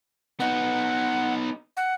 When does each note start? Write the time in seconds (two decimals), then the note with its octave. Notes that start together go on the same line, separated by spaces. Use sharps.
0.40 B3 D#4 F#5
1.77 F#5